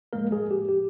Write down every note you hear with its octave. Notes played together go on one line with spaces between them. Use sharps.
A2 F3 G#3 A#3 A#4
G#3 G#4
G4
G4